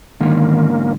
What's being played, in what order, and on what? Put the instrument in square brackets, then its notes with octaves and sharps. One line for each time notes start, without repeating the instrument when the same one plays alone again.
[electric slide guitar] G#2 D3 [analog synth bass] D#3 [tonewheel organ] A#3